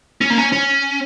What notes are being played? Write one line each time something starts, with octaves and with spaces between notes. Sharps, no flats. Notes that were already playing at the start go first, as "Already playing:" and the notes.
C#4
A#3
C#4
C#4